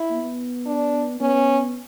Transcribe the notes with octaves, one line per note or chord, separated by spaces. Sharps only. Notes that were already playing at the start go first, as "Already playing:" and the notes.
Already playing: E4
B3
D4
B3 C#4